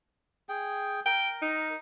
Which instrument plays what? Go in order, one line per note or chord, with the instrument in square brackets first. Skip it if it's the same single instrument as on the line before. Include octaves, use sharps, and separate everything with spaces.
[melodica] G#4 G5
[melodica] A#4 [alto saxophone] G5
[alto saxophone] D#4